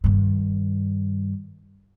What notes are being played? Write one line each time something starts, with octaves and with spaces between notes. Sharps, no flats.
G2 D#3